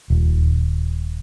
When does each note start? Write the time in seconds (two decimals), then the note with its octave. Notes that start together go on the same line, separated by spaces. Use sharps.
0.10 D#1